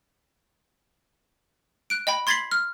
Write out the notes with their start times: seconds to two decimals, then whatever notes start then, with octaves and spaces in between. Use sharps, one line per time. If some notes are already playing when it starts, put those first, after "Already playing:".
1.90 F#6 D7
2.07 D#5 G5 B5
2.27 C6 G#6 A6 B6 C7 F#7
2.51 F6